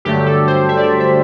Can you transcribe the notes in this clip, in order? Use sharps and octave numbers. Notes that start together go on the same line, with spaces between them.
G2 D3 F#3 A3 G4
A4
C5
E5
D5
E5
E5